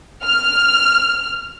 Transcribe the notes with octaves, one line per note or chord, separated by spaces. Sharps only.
F6